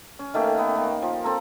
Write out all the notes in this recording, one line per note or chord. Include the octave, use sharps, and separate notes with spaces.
C#4
D#3 A3 A#3 G4
B3
A#3
F3
C4 A4 A#5